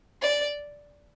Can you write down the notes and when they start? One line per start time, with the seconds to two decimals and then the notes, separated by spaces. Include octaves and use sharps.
0.21 D5